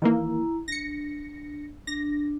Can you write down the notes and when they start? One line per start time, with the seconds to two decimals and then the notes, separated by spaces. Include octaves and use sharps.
0.02 D#3 E3 A#3 E4 A#5
0.68 D4 A#6 C#7
1.87 D4 A#6